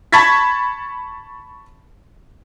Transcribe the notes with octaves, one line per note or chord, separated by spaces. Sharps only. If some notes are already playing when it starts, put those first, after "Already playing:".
A5 B5 C#6 G#6 A6 B6